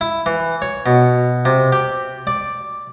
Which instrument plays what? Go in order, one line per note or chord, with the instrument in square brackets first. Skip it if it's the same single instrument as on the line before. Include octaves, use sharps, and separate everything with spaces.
[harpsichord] E4
E3
C#5
B2
C3
G4
D5